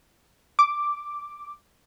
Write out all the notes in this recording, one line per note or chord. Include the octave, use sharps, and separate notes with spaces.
D6